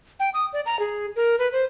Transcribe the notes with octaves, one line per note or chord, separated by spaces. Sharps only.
G5
D#6
D5
A#5
G#4
A#4
B4
C5